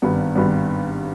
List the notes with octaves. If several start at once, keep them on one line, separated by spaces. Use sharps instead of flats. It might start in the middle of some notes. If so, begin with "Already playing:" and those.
G#1 G2 G3 B3
G#1 G2 G3 B3